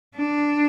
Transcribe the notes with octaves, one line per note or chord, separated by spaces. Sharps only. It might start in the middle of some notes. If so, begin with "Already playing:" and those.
D4